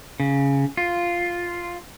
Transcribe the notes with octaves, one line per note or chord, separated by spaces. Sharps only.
C#3
F4